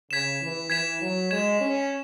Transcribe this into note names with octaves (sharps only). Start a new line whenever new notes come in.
C#3 G#6 B6 E7
E3
E3 G#6 B6 E7
F#3
G#3 G#6 E7
C#4